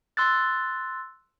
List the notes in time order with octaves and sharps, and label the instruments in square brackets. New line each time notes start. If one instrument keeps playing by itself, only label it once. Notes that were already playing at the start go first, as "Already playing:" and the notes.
[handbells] C6 E6 F#6 A6